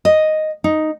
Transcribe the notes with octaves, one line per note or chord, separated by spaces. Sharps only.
D#5
D#4